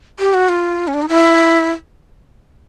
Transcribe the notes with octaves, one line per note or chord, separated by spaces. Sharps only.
G4
F#4
F4
C#4
D4
D#4
E4